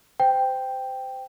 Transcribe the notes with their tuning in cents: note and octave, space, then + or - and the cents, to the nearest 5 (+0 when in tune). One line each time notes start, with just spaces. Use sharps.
C5 -25 G5 +0